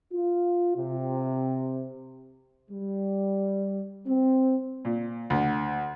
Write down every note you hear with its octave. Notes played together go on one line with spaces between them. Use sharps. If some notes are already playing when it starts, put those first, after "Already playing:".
F4
C3
G3
C4
A#2
D2